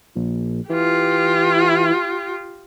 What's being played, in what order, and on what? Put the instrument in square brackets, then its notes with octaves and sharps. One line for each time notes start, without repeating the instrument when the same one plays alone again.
[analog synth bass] A#1
[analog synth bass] E3 [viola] F4 G4